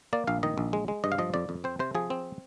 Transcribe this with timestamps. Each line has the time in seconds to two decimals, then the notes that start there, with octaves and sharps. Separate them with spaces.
0.13 A#3 D5
0.27 A#1 F5
0.43 D#3 D#5
0.58 A#1
0.73 G#3
0.88 G#3
1.04 G2 D#5
1.12 F5
1.18 F3 D#5
1.34 F2 D5
1.49 F2
1.64 C4 C5
1.79 C3 C5
1.95 F3 G#4
2.10 C4